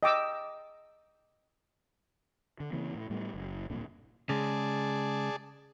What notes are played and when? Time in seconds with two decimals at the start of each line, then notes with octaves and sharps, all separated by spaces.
0.03 D#5 G5 D6 E6
2.60 D3
2.72 C#3 E3 A#3 C4
2.95 A2
3.10 A2 G3 A3 B3
3.34 F#1
3.70 D1 C2 A#2 D3
4.29 C#3 G#3 G#4 D5 A5